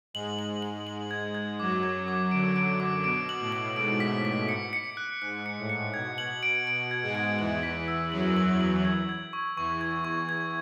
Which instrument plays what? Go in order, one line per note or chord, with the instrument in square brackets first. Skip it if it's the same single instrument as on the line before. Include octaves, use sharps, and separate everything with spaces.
[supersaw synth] G#2 G#3 [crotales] F#7
[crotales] F#7
F#7
F#7
G#6
G#6
[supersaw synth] F#2 F#3 [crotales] D6
[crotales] G#6
D6
[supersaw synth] D3 [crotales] D7
[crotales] D7
D6
[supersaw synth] B2 [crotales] D7
[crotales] F#7
[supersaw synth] A2
[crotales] F#7
[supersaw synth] G#2 [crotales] D7
[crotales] B6
B6
C#7
C#7
F#6
[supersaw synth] G#2 [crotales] F#6
[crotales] C#7
[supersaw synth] A2
[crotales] C#7
[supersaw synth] B2 [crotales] G#6
[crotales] F#7
D7
[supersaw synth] B2 [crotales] D7
[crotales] G#6
[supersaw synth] G#2 G#3
[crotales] D7
[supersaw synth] E2 E3 [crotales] F#7
[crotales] B6
E6
[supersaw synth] F#2 F#3 [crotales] F#7
[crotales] F#7
F#7
G#6
G#6
C#6
[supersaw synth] E2 E3 [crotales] C#6
[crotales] G#6
C#6
G#6